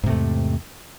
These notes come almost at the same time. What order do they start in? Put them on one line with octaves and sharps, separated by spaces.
G#2 C3 A3 E2